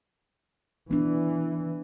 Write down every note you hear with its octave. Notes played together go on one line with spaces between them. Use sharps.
E3 B3 D4